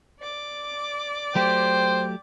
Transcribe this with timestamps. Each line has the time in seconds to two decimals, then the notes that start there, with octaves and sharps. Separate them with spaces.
0.19 D5 D6
1.35 F#3 A3 G4 C5 G5